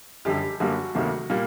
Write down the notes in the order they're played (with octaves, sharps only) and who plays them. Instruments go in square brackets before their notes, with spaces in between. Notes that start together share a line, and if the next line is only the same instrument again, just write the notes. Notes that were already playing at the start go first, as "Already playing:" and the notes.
[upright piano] F#1 F#2 D3 G3 G4
F#2 D3 G3 A#3 F#4
D2 C3 D#3 F#3 A#3
A#2 G3 A#3